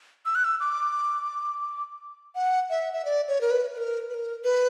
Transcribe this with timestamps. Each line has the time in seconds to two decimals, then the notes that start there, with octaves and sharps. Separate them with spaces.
0.26 E6
0.35 F#6
0.44 E6
0.60 D6
2.35 F#5
2.70 E5
2.93 E5
3.05 D5
3.28 C#5
3.41 A#4
3.51 B4
3.74 B4
3.77 A#4
4.10 B4
4.14 A#4
4.44 B4